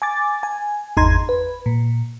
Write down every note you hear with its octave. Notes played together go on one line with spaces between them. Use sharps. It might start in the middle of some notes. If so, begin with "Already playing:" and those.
G#5 D6 A6
G#5
G#1 E2 D#4 A#5 C6 G#6
B4
A#2